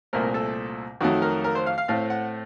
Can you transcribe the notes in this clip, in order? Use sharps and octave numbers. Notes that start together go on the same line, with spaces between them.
C2 A#2 A3 C4 A#4
A4
F2 D#3 F#3 A3 F#4
A#4
A#4
C5
F5
F5
A2 A3 C4 F5
F#5